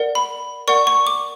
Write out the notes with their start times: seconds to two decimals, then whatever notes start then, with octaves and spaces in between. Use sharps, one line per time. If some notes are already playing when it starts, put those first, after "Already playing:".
Already playing: A#4 D5 F#5
0.15 B5
0.68 A#4 D5 F#5 C#6
0.87 C#6
1.07 D6